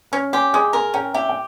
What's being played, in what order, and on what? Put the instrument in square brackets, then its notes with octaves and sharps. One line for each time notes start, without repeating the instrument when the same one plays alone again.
[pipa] C#4 [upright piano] C#6 F6
[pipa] G4 [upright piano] G#5 C6
[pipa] G#3 [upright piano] G#5 C6
[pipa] A#4 [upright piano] G#5 C6
[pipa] C#4 [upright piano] G5 A#5
[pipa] G4 [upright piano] E5 G5
[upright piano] G5